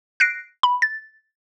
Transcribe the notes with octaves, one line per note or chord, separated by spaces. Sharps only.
F#6 A#6 C7 D7
B5
A6